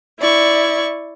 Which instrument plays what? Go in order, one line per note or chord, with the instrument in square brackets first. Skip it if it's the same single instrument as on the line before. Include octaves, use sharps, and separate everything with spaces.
[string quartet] E4 D5 C#6